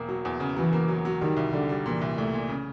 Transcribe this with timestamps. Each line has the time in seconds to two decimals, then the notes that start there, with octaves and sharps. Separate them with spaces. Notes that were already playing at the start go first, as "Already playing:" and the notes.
Already playing: E1 A#3
0.08 F#3
0.25 E2
0.40 C#3
0.56 E3 F#3
0.73 A#3
0.88 F#3
1.05 F#3
1.21 D#3 G3
1.36 C2
1.53 D3 G3
1.69 G3
1.86 A#2 E3
2.01 C2
2.17 C2 A3
2.33 A#2
2.49 C#3